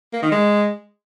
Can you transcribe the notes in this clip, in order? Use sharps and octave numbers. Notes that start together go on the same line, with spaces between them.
A#3
D#3
G#3